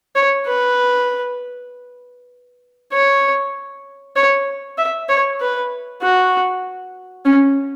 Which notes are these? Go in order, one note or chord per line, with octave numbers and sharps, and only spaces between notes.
C#5
B4
C#5
C#5
E5
C#5
B4
F#4
C#4